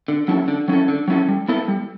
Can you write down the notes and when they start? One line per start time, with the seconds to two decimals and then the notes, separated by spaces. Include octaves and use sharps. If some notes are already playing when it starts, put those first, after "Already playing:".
0.08 D3
0.28 F#3 C#4 E4 A4
0.48 D3
0.68 F#3 C#4 E4 A4
0.88 D3
1.08 F#3 C#4 E4 A4
1.29 G3
1.48 B3 E4 A4
1.68 G3